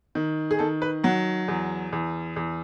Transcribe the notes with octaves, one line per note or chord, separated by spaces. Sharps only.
D#3
G#4
D#3 A4
B4
F#3 F#5
E2
E2
E2